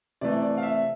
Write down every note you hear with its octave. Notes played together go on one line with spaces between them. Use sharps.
C3 E3 A3 D5
D5
F5
E5